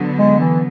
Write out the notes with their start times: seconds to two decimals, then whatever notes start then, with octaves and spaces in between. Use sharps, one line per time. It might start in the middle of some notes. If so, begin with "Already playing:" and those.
Already playing: D3 F#3 B3
0.19 G#3
0.40 E3